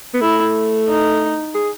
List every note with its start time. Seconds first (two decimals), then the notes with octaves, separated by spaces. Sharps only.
0.14 B3
0.21 A3 E4
0.88 D#4
1.55 G#4